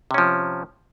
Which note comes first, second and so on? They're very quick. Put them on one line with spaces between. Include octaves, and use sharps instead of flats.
C3 C#4 F3